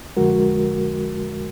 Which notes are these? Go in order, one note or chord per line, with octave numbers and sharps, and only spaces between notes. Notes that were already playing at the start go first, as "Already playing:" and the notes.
F2 D3 F3 G#3 F#4 A#4